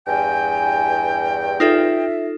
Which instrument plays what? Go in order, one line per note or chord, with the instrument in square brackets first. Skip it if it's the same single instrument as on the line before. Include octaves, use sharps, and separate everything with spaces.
[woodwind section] E2 G2 G5 [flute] G#5
[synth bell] D#4 F4 A4 [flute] E5